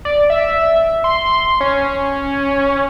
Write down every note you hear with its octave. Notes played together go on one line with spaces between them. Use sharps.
D5
E5
C6
C#4